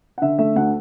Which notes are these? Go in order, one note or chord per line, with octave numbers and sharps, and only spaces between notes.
F#5
D3 E5
A3 E5
D2 F#5